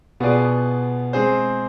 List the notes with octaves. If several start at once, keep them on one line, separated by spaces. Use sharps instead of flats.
B2 B3 F4 G#4 D5
G#3 C4 G#4 C5